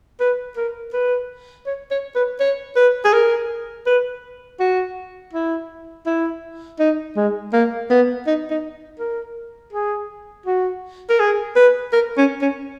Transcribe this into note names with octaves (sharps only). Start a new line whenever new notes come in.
B4
A#4
B4
C#5
C#5
B4
C#5
B4
G#4
A#4
B4
F#4
E4
E4
D#4
G#3
A#3
B3
D#4
D#4
A#4
G#4
F#4
A#4
G#4
B4
A#4
C#4
C#4